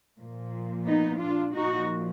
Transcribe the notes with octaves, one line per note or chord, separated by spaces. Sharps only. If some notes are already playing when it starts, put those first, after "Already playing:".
A#2 F3
B3 D#4
D4 F4
A#2 F3 D#4 F#4